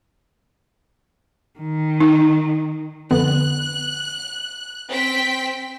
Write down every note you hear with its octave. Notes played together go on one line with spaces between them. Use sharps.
D#3
D#4
F2 D3 B3 F#6
C4 G5 B6